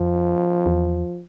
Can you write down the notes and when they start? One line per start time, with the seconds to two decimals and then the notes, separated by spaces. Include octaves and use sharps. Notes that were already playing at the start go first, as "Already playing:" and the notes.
Already playing: F2 F3
0.66 E2